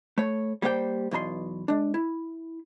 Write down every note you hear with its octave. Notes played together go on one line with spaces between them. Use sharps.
A3 C#5
G3 A#3 G4 C5 F5 G5
B1 E2 B2 A#5 C6
G#3 D4
E4